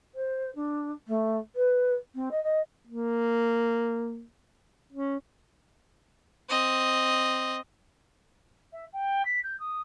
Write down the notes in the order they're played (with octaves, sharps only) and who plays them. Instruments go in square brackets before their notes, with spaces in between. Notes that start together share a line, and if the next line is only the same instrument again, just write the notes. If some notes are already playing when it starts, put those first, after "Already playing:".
[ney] C5
D4
A3
B4
C4
D#5
D#5
[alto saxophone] A#3
C#4
[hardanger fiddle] C4 D#5
[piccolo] E5
G5
B6
G6
D#6